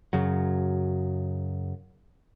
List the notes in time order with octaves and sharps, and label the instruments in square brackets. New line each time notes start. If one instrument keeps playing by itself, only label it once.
[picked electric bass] F#2 C#3 F#3